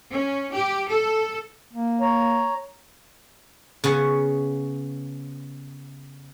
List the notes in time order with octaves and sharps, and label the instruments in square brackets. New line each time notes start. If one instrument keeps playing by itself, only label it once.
[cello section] C#4
G4
A4
[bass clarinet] A#3
[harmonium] C#5 A#5
[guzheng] C#3 B3 C#4